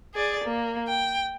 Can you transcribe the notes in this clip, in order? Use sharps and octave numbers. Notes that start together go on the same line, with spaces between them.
G#4 D5
A#3
G5